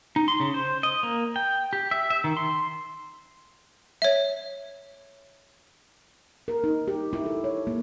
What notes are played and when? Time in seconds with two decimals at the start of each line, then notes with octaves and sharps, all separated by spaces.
0.16 D#4
0.28 C6
0.40 C#3
0.54 C5
0.83 D#5
1.03 A#3
1.36 G5
1.73 G4
1.91 E5
2.10 E5
2.24 D#3
2.37 C6
4.02 C#5 E5
6.48 A#4
6.64 D#4
6.88 G4
7.13 E4
7.26 A4
7.44 C#5
7.67 A#3